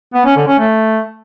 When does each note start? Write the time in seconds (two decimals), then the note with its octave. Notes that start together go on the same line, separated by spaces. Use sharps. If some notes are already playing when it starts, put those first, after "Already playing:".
0.14 B3
0.25 C#4
0.36 D3
0.47 C#4
0.59 A3